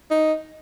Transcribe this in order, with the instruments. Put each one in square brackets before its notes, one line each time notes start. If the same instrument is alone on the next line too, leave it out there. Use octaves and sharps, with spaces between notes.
[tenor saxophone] D#4